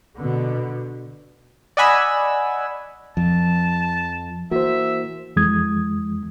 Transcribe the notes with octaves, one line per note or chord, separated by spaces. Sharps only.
B2 D3
D5 D#5 F#5 G#5 B5 E6
F2 F3 A5
E3 A#3 F#4 C5 E5
F2 E3 G#3 D#6 G#6